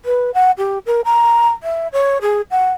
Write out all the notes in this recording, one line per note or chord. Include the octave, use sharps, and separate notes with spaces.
B4
F#5
G4
A#4
A#5
E5
C#5
G#4
F#5